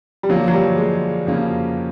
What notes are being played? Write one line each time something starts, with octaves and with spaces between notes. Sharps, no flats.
G3
D3 F3 F#3 A#3 D4 F4
F#3
G3
G#3
F2 C#3 F#3 A#3 C#4